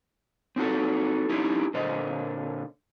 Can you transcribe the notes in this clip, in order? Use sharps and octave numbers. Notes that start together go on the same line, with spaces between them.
C4 D#4 F#4 A4
C#4 D#4 E4 G4
A#2 D3 C5 D#5